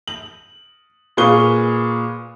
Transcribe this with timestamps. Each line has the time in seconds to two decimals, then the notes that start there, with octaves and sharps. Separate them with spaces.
0.08 F#7
1.17 A#2 G#4 B4 F5 C#6 G7